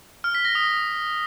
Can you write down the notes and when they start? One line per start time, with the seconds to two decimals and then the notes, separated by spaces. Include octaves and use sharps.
0.24 F6
0.35 B6
0.45 A#6
0.55 D#6